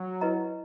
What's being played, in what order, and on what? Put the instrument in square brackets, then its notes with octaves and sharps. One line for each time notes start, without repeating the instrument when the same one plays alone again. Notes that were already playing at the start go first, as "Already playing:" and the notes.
Already playing: [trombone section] F#3
[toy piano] E4 B4 D#5 A#5